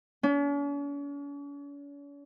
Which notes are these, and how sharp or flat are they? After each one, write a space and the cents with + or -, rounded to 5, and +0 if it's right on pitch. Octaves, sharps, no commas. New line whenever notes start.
C#4 +45